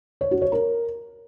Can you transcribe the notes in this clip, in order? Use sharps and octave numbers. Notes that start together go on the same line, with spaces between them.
C#5
F#4
C#5
A#4